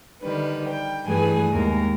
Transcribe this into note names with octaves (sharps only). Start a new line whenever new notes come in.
D3 D#3 G3 B4
G5
G2 E3 A3 G#4 B4 G#5
D#2 G#2 A#4